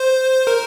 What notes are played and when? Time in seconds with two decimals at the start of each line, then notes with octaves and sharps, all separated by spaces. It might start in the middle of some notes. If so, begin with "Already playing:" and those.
Already playing: C5
0.47 A#4